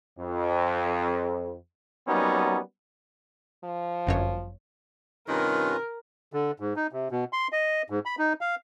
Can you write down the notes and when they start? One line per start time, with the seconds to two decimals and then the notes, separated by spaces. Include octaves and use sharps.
0.19 F2
2.07 F#3 G3 A#3 B3 C#4 D#4
3.64 F3
4.07 G1 F#2 C#5
5.29 G2 C3 D#3 C#4 F4 A#4 B4
6.33 D3
6.60 G#2
6.76 D#4
6.92 C3
7.11 B2
7.33 C6
7.52 D#5
7.90 G#2
8.05 B5
8.19 D#4
8.41 F5